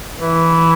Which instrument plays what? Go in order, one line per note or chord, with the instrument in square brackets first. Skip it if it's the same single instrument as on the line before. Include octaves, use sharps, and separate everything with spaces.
[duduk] E3